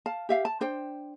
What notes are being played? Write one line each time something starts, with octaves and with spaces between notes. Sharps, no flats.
F5 A5
G4 E5 F5
A5
D4 C5 G5